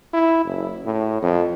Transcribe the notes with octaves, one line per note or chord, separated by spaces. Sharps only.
E4
F#1
A2
F2